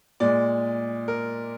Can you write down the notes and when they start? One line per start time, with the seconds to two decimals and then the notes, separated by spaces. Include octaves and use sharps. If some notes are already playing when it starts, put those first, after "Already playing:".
0.20 A#2 G#3 D5
1.08 A#4